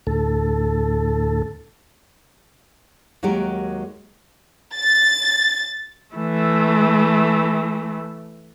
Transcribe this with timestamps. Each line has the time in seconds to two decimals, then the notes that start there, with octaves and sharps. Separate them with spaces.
0.07 D2 A2 A4
3.23 D#2 F#3 G#3 F#4 G4 A#4
4.77 A6
6.16 E3 A3